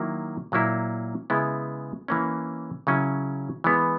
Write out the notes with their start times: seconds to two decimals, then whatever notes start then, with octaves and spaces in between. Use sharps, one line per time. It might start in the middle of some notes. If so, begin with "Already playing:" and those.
Already playing: D#3 F#3 A#3 E4
0.52 A#2 F#3 A#3 E4
1.30 C#3 G#3 B3 E4
2.08 E3 A#3 C#4
2.87 C#3 F#3 C#4 E4
3.64 E3 G#3 B3